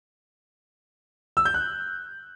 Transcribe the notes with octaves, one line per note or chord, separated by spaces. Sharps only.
E6
G6
F#6